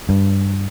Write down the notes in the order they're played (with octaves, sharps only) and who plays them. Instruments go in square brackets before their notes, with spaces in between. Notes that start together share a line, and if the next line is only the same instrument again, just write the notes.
[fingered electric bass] G2